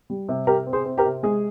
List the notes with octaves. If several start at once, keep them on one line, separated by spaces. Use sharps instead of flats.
G3
C3
C3 G4 A#4
C4
G#4 C5
C4
G4 A#4
C3
G#3 G#4